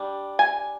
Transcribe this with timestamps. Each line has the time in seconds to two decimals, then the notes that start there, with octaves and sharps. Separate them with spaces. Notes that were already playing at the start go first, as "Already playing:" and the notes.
Already playing: G3 D4
0.39 G#5